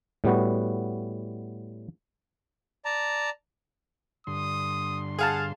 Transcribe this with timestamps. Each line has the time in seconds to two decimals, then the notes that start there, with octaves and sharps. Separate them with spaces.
0.24 A2 G3 B3 F#4
2.85 D5 A5 A#5
4.27 G2 D3 C6 D#6
5.19 G#4 F5 F#5 A5